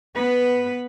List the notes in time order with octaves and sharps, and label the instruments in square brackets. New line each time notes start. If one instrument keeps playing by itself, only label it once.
[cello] B3 B4